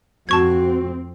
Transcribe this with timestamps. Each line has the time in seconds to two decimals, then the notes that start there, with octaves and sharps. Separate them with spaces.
0.29 F2 C4 F#4 A5 C#6 G#6